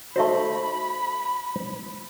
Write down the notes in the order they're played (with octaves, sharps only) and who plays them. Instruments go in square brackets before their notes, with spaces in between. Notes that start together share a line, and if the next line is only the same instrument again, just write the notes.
[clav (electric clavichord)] A3 D#4 C5 [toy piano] F#4 E5 C#6 [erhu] B5